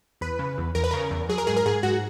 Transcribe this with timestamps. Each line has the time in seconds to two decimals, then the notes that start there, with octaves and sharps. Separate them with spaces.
0.21 E2 B4
0.39 C#3
0.58 E2
0.75 E2 A#4
0.84 B4
0.91 C#3 A#4
1.11 E2
1.29 F#3 G#4
1.38 A#4
1.47 G#2 G#4
1.56 A#4
1.66 G#2 G#4
1.83 G#2 F#4